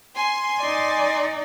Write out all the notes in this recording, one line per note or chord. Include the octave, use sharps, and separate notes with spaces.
G#5 C6
D#4 D5